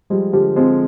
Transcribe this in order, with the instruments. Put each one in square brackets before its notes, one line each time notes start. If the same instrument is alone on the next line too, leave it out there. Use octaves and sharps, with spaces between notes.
[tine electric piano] F3 G#3 [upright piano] G3
[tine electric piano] D3 F3 [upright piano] G4
[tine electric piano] F3 G#3 [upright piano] C4